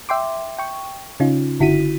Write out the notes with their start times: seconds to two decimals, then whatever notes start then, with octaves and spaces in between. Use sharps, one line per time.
0.09 E5 G5 C6 D6
0.59 G5 C#6
1.20 C#3 C#4 D#4 F4
1.60 G1 D3 E4 F#4 B6 D#7